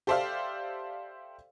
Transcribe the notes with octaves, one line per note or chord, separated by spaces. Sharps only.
G4 A4 C5 D5 E5 F5